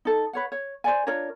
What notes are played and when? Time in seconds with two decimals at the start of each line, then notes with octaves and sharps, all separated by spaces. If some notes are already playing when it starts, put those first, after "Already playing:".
0.05 D#4 A4
0.33 B4 C#5 F#5
0.52 C#5
0.84 C5 D5 G#5
1.07 D4 F4 A#4 C#5